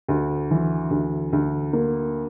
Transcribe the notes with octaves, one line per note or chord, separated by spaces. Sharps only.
D2
E3
D2
D2
A#3